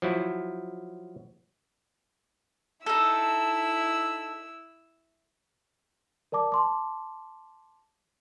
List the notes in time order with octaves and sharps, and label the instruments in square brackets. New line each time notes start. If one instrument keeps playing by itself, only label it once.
[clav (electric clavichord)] F3 F#3 E4
[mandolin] D#4 A4 [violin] E4 E6
[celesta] A#4 D5 A5 D6
A5 C6 D6